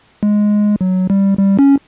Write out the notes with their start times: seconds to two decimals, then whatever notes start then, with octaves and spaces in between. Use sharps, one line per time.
0.23 G#3
0.81 F#3
1.10 G3
1.39 G3
1.59 C#4